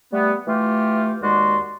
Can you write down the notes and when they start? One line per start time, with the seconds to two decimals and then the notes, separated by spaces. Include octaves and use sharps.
0.13 G3 A3 B3
0.47 E3 A3 F4 G4
1.22 D#2 G#3 F#4 D5 C6